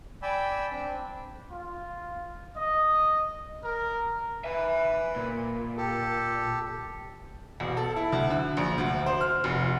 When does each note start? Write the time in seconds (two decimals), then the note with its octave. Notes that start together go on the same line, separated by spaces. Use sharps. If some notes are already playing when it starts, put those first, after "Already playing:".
0.22 D5 G5 G#5 B5 E6
0.71 C4 D4
1.51 F4
2.56 D#5
3.63 A#4
4.44 B4 E5 G#5
5.16 A#2
5.77 G4 A4
7.60 E1
7.77 A4
7.96 E4
8.12 D2
8.30 D3
8.57 A#1
8.78 D2
9.06 C5
9.21 F6
9.44 F1